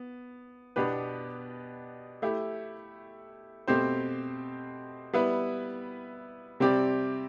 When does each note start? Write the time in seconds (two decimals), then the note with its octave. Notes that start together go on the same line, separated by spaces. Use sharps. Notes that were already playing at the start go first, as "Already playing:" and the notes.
Already playing: B3
0.76 B2 B3 D4 G4 B4
2.22 A3 E4 G4
3.67 B2 A3 C4 G4 C5
5.13 G3 B3 E4 B4
6.60 C3 G3 C4 G4 D5